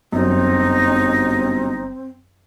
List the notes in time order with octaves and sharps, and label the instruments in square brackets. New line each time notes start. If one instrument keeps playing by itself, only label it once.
[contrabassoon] G1 [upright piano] F#2 [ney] C4 [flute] D#4